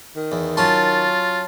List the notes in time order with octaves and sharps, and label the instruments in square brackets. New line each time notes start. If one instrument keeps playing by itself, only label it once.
[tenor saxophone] D#3
[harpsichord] E2
[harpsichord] F#3 C#4 C6 [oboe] F4 [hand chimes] A5 A6